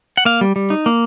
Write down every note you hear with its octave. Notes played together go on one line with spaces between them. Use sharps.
F#5
A#3 F5
G3
G3
D#4
A#3